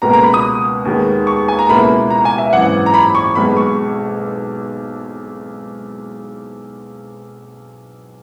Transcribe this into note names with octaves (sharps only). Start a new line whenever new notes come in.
C#2 B2 A#3 A#5
A#5
B5
D#6
D#2 D#3 G#3 B3
C#6
G#5
A#5
C#2 B2 A#3 E4 B5
A#5
G#5
E5
G#1 F#2 E3 F#5
A#5
B5
C#6
B1 B2 G#3 B5
C#6